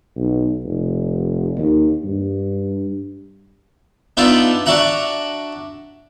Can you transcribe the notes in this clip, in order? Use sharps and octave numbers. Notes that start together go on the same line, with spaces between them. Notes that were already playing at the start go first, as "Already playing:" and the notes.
B1
F1
D#2
G2
B3 D4 D#4 F4 B4 E5
D4 F#4 E5 F#5 A#5